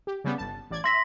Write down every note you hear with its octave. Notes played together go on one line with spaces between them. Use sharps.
G4
C#3 G3 B3
G1 A5
A1 D5 G#6
E5 C6 A#6 B6